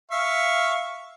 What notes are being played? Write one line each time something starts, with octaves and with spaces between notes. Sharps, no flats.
E5 F5 C#6